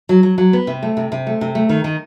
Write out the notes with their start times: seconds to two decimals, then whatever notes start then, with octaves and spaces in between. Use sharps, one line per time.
0.09 F#3
0.23 F#3
0.38 F#3
0.53 B3
0.67 C3
0.83 A3
0.97 C3
1.12 C3
1.27 A3
1.41 C3
1.55 A3
1.69 D#3
1.84 D#3